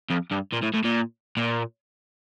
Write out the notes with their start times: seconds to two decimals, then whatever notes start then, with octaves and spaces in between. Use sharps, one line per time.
0.10 F2
0.32 G2
0.53 A#2
0.63 A2
0.74 A2
0.85 A#2
1.37 A#2